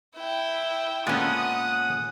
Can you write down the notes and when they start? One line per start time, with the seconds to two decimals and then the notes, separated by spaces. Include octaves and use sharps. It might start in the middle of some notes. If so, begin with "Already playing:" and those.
0.16 E4 G5
1.07 A#2 G#3 B3 C#4 A4 F#5 D#6